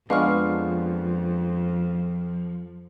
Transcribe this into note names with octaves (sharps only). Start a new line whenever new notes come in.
F2 F3 G#3 B3 D4 F5 C#6 F6